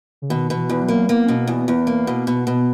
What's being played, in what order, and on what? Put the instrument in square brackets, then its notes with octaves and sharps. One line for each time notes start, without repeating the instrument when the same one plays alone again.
[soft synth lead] C#3
[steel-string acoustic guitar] B2 [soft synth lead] D#3
[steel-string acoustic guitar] B2
[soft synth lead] E3
[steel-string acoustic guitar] E2 [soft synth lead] E3
[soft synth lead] F#3
[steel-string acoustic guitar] A#3
[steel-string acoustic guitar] A#3 [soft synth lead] B3
[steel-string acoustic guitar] B2 [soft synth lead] C#4
[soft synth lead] B3
[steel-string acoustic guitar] E2
[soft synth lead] B3
[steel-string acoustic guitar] E2
A#3
B2
B2
B2